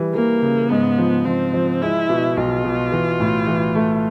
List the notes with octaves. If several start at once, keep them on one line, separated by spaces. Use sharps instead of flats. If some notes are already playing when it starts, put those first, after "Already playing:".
Already playing: E3 G3
E3 A#3
C#3
G#2 B3
F3
F3 C4
F3
G#3 E4
B2
B1 F4
B2
E3
A2
E3
A3